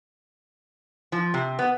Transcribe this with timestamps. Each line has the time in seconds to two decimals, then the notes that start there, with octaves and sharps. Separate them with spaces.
1.12 F3
1.34 C3
1.59 B3